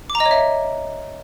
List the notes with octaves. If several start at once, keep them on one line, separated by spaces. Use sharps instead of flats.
D6
A#5
D#5
C#5
E5